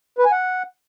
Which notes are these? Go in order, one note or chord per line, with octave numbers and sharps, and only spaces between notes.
B4
G#5
F#5